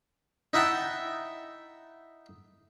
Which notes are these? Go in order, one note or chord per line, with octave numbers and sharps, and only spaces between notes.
D#4 E4 E5 F#5 G5 A5